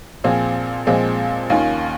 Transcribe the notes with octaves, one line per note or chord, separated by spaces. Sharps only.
A#2 F3 C4 F4 G#4
A#2 F3 G#3 C4
D#2 D#3 A#3 C#4 F4